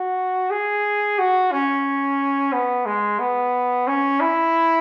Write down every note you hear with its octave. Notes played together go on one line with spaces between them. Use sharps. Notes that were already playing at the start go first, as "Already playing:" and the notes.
Already playing: F#4
G#4
F#4
C#4
B3
G#3
B3
C#4
E4